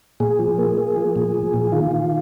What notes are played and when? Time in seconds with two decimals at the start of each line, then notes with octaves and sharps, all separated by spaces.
0.20 A#2 G#4
0.39 F3
0.58 A#3
0.77 A#3
0.96 F3
1.16 A#2
1.34 F3
1.53 A#2
1.72 D#3 F4
1.91 D#3